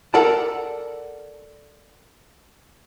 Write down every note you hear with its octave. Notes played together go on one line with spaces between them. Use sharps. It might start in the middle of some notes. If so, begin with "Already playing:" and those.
A4 A#4 D5 F#5 A5